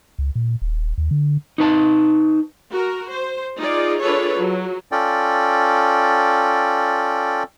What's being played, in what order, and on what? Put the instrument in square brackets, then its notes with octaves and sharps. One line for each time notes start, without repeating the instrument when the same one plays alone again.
[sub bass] C#2
A#2
D#1
D#2
D3
[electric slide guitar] D#4 B4 A5
[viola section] F#4 A#4
C5
D#4 F4 G#4 D5
D4 F4 G#4 A4 B4 C#5
F#3
[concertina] C#4 F4 A4 D5 G5